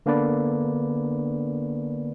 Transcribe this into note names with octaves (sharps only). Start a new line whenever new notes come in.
D3 A#3 B3 D4 B4 D5